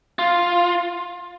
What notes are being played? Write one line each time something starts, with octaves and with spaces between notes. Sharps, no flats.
F4